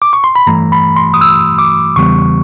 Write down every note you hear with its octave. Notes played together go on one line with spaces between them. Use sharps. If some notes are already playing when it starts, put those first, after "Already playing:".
D6
C#6
C6
B5
G2 E3 A3 A#5
B5
C6
D#6
E6
D6
E2 C#3 E3 G3 B3 C#6